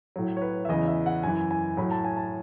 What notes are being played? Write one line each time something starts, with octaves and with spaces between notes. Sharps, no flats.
A2 F#3
C#5
B4
E5
E2 C#3 E3 D#5
E5
F#5
F#2 E3 G#5
G#5
A2 F#3 B5
A5
G#5
A5